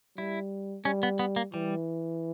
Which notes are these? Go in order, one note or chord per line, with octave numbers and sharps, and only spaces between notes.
G3 E4
G3 C#4
B3
B3
A#3
E3 G3